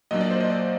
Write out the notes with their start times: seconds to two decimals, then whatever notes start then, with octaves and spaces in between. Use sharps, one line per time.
0.11 A#2 F#3 A#3 D4 D#5
0.21 D5
0.31 C5
0.40 D#5
0.50 D5